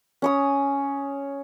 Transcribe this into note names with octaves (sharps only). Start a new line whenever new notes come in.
C#4 C#5 D#6